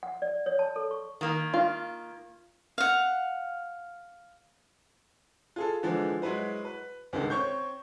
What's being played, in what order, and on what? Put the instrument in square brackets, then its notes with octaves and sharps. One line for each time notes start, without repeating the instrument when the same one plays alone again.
[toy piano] F#5
D5
C#5
A5
A4
C#6
[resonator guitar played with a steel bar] D#3 A#3
[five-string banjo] F4
[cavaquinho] F5 F#5
[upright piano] F4 G#4 A4
D3 E3 F3 G#3
F#3 G#3 E4 B4 C5
B4
C#2 D3 D#3 G#3
C4 C#5 C#6 G6